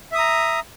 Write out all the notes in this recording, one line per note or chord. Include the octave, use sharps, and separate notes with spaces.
E5 A#5 D#6